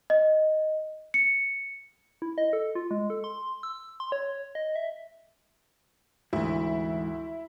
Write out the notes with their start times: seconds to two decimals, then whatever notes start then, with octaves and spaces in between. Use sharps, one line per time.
0.10 D#5
1.14 C#7
2.22 E4
2.38 D#5
2.53 A4
2.75 F4
2.91 G#3
3.10 A4
3.24 C6
3.63 E6
4.00 C6
4.12 C#5
4.55 D#5
4.76 E5
6.33 D2 G#2 E3 E4